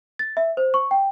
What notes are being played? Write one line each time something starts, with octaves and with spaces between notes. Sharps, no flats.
A6
E5
C5
C#6
G5